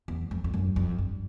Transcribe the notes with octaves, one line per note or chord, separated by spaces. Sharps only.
E2
F2
F2
F#2
F2
G2